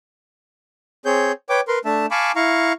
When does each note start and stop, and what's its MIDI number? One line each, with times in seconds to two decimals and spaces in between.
1.05 1.32 60
1.05 1.32 68
1.05 1.32 73
1.05 1.32 91
1.49 1.61 71
1.49 1.61 73
1.49 1.61 79
1.49 1.61 86
1.68 1.79 70
1.68 1.79 71
1.68 1.79 84
1.85 2.06 57
1.85 2.06 62
1.85 2.06 76
1.85 2.06 81
2.11 2.32 77
2.11 2.32 80
2.11 2.32 81
2.11 2.32 83
2.11 2.32 85
2.11 2.32 86
2.36 2.73 64
2.36 2.73 77
2.36 2.73 82
2.36 2.73 85